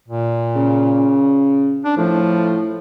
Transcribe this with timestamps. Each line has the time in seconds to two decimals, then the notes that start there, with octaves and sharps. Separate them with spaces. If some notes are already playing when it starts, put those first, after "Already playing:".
0.08 A#2
0.55 C#3
1.85 D4
1.97 A2 F3